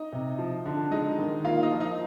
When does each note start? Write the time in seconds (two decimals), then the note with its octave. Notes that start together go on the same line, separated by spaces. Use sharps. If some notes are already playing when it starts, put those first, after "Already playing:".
Already playing: D#4 D#5
0.12 C3
0.38 F3
0.65 D3
0.91 G#3 D#4 D#5
1.18 D#3
1.44 A#3 F4 F5
1.63 D#4 D#5
1.71 F3
1.80 D#4 D#5